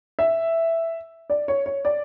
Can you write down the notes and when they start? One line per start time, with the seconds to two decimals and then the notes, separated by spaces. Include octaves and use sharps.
0.19 E5
1.30 D5
1.48 C#5
1.66 C#5
1.85 D5